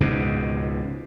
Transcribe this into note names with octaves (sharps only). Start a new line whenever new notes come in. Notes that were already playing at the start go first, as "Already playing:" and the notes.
C#2 G#2 B2